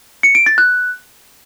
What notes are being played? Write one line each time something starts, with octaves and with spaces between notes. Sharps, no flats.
C#7
D7
A6
F#6